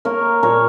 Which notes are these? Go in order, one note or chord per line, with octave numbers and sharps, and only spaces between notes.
A#3 A#4 C#5
A#2 A#4 C#5